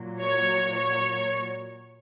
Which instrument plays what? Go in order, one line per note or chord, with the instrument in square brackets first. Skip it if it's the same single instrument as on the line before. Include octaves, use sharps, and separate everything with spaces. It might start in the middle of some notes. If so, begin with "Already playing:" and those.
Already playing: [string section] A#2 F#3
C#5
C#5